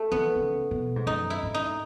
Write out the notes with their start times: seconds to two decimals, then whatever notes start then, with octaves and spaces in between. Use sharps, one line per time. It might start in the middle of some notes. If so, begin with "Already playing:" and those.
Already playing: A3
0.12 D#3 B3
0.36 C#3
0.71 B2
0.96 G#2
1.07 F#2 D#4
1.30 E4
1.43 G#2
1.54 D#4